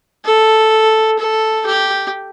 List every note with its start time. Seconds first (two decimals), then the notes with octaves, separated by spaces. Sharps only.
0.25 A4
1.18 A4
1.66 G4